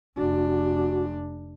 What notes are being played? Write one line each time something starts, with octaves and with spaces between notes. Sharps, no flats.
F1 D4 F#4